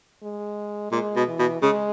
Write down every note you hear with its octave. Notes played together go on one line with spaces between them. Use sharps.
G#3
A#2 G#3
B2
E3
B2
C#3 G#3